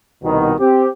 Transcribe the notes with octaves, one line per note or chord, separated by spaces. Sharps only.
C2 B2 D#3
C4 G4